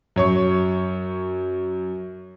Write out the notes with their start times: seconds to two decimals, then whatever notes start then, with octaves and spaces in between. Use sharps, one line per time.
0.16 F#2 C#5 C#6